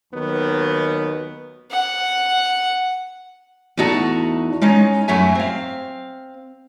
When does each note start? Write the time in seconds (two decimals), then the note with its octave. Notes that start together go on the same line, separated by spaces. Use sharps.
0.13 D#2 D#3 F#3 B3
1.71 F#5
3.77 E2 A3 D#4 F#4 A5
4.62 G#3 C#4 D#4
5.08 F#2 F#3 A3 E5 G#5
5.35 C4 F5